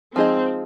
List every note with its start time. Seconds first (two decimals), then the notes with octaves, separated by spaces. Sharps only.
0.16 F3 G#3 C4 D#4 G#4 D#5